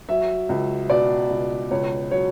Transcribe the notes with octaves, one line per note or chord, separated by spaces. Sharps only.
F#3 E5
C#2
B2 D5
C#2
C#2 C#5
F#3 C#5